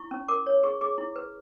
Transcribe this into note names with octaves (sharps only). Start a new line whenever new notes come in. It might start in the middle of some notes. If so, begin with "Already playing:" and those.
Already playing: E4 C#6
C#4
A#4 D6
C#5
G#4 C#6
G#4 D6
E4
B4